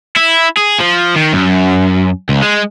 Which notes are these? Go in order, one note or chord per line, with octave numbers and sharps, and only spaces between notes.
E4
G#4
F3
D#3
F#2
C#2
G#3